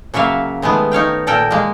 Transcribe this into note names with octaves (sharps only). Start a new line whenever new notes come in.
C#3 F#3 A#3 E5 F5
D#3 G#3 A3 B3
D#4 C#5 F5 G5
A#2 A4 A#4 G5
G#3 A#3